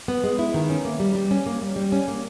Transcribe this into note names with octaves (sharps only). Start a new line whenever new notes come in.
B3
G#3
E4
D#3
C#4
A#3
G3
G3
C#4
A#3
G3
G3
C#4
A#3